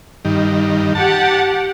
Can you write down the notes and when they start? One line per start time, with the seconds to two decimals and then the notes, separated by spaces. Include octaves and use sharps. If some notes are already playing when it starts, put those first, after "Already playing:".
0.25 G2 D#3
0.95 G4 F#5 A5